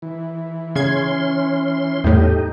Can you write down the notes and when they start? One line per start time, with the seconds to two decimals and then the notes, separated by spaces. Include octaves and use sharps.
0.02 E3
0.76 C#3 C#4 C6 G#6
2.04 E2 A2 A3 D#4 G4